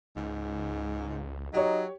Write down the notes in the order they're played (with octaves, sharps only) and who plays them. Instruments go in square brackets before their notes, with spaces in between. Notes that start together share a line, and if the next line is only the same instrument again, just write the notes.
[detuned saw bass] C#2 [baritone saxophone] G#2
[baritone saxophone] F#3 [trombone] D#4 [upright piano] G4 C#5